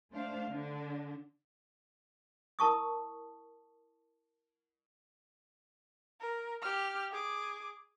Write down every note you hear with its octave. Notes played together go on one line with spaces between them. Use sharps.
A3 D4 C5 F5
D3 D4
E4 A#4 A5 C#6 D#6
A#4
G4 F6
G#4 D6